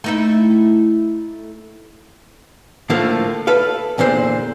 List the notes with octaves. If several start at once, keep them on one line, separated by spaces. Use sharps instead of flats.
A3 D#4 E4
A2 D3 F3 A3 A#3
A4 B4 F5
E2 A#2 D3 C5